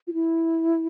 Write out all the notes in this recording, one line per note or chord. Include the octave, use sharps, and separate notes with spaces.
F4
E4